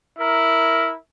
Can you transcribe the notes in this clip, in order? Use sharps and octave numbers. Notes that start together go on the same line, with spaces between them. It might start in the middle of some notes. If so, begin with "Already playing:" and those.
E4 A#4